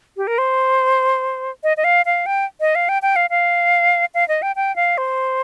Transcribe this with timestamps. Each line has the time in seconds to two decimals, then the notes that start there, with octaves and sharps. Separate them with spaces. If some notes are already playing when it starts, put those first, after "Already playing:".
0.17 G4
0.27 A#4
0.38 C5
1.63 D#5
1.77 D#5
1.84 F5
2.06 F5
2.26 G5
2.60 D#5
2.75 F5
2.89 G5
3.02 G5
3.16 F5
3.30 F5
4.14 F5
4.28 D#5
4.42 G5
4.56 G5
4.76 F5
4.98 C5